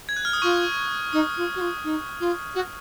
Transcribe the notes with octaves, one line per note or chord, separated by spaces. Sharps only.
G#6
F#6
F6
D#6
F4 C#6
D#4 D#6
F4
F#4
F4
D#4
F4
F#4